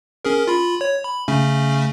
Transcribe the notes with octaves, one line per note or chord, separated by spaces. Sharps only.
C#4 G#4 A#4
F4 B5
C#5
B5
C#3 A3 C#4